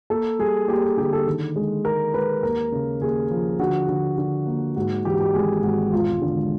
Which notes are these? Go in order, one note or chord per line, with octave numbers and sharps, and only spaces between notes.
A#3 A4
G3 G#4
A#3 G4
G#4
D3 G4
A4
D#3
G#3
G#3 A#4
G#3 B4
D#2 A#4
C#3
D#2 G#4
F3
D3 F#4
D3
D3
A#3
G#2 F#4
E3 G4
F#4
G4
G#1 G#4
G#1 F#4
E1 F4
D3